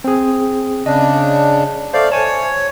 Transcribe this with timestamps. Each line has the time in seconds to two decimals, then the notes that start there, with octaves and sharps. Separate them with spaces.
0.04 C4 G#4
0.86 C#3 D4 D#5
1.94 A3 C5 D5 F5
2.12 C5 C#5 G#5 A5